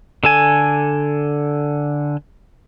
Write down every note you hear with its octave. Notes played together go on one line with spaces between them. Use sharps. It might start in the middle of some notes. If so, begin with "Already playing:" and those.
D3 A4 G#5